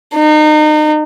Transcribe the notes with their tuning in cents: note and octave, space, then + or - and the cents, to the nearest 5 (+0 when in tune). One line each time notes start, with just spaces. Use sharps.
D#4 -30